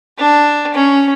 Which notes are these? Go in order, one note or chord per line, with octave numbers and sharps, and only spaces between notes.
D4
C#4